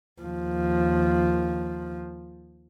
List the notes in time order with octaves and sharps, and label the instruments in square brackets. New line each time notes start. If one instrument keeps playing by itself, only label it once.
[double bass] D#2 F3